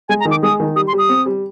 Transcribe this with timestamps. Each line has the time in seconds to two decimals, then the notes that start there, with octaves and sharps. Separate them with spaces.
0.09 G#3 G#5
0.20 A#5
0.25 D#3
0.31 D6
0.43 G#3 D#6
0.60 D#3
0.76 G3 D#6
0.88 C6
0.93 G3
0.98 D#6
1.09 C4
1.26 G3